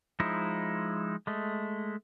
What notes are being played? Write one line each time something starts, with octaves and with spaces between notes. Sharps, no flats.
F3 G#3 D#4 E4
G#3 A3